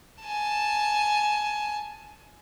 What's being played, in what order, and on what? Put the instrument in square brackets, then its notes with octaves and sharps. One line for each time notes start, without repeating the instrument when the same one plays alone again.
[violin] G#5 A5